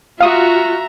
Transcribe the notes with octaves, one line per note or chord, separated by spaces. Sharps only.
F4 F#4 E5 F5 A#5 D#6